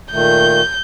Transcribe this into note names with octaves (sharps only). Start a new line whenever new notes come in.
A#2 D#3 A3 G6